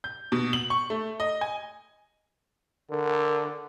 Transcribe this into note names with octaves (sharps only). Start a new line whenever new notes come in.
G6
B2
F#7
C#6
A3
D#5
G#5
D3 A#4